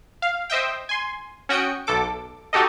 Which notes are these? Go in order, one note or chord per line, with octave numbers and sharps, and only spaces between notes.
F5
C5 D#5 E5 G5
G#5 C6
C#4 F#4 G5 D#6 C#7
B1 A4 D6
D#4 F#4 G4 A4 D#5